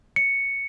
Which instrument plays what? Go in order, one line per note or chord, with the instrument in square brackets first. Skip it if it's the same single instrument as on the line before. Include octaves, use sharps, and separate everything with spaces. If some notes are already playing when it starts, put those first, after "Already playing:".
[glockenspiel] C#7